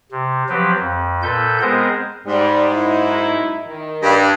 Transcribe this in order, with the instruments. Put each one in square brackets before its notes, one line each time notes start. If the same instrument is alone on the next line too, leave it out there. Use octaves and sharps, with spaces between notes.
[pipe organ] C3
F3 F#3 C4 G4 B4
F2
A#2 A4 B4 G6
G#3 B3 C4 G#4 A#4 C5
[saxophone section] G#2 [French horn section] G3
[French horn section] F#2 D#4 E4
D#3
[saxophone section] G2